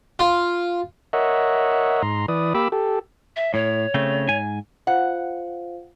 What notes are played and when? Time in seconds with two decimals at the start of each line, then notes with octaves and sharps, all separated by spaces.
0.19 F4
1.13 A#4 C#5 D#5 E5 F#5
2.02 G#2 A#5 C6
2.28 E3 B4 D5 D#6
2.54 A#3 G4 B5 D6 E6
2.72 G4 A4
3.36 E5
3.54 A2 C#5
3.94 C#3 A3 C4
4.28 G#2 G#5
4.87 F4 C5 F5 F#5